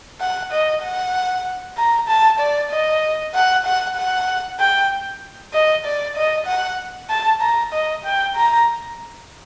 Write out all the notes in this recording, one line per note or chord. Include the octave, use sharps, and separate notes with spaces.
F#5
D#5
F#5
A#5
A5
D5
D#5
F#5
F#5
F#5
G5
D#5
D5
D#5
F#5
A5
A#5
D#5
G5
A#5